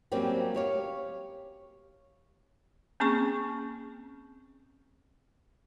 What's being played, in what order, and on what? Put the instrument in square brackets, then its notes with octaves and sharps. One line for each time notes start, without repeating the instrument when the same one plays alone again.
[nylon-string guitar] F#3 G3 A#3 C4 C#4 G4
G4 C#5 F5
[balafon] A#3 C4 C#4 G#4 C#6